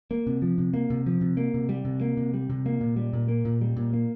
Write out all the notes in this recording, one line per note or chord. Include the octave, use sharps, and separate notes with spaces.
A#3
C3
F3
C3
A#3
C3
F3
C3
A#3
C3
G3
C3
A#3
C3
G3
C3
A#3
A#2
G3
A#2
A#3
A#2
G3
A#2
A#3